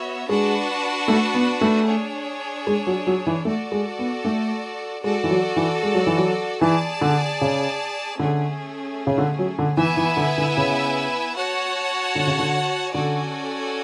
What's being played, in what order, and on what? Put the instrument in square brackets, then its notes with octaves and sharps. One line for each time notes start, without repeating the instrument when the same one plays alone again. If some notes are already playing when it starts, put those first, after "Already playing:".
Already playing: [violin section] B3 F#4 C#5 E5
[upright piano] G#3 [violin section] D4 F#4 B4 F#5 A5
[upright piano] A3
B3
A3
[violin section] D4 G#4 C#5
[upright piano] G#3
F#3
F#3
E3
[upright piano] A3 [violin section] F#4 A4 D5
[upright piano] G#3
B3
A3
[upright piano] G#3 [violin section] F#4 A4 D5
[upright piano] E3
F#3
E3
G#3
F#3
E3
F#3
[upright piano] E3 [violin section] G#4 D5 A5
[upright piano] D3
C#3
[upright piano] D3 [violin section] A3 C#4 G#4
[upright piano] C#3
D3
F#3
D3
[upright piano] E3 [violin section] B3 E4 B4 E5 G#5
[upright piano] E3
D3
D3
C#3
[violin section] F#4 C#5 F#5 A5
[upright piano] D3
C#3
D3
[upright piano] D3 [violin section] C#4 F#4 A4 D5 G#5